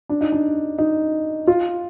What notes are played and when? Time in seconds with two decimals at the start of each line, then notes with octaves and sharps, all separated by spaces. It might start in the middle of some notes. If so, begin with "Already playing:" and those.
0.09 D4
0.21 D#4
0.32 D4
0.78 D#4
1.47 F4